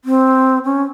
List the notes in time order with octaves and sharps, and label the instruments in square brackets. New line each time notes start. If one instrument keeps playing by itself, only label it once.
[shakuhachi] C4
C#4